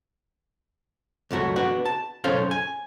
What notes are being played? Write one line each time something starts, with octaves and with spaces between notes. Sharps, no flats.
C#2 F#2 A3 F#4
B3 D4 F#4
A5
B1 F#2 C#4 A4 C5 F5
G#5